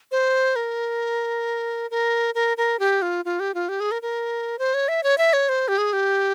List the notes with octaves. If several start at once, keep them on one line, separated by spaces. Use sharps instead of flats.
C5
A#4
A#4
A#4
A#4
G4
F4
F4
G4
F4
G4
G#4
A#4
A#4
C5
C#5
E5
C#5
E5
C#5
C5
G4
G#4
G4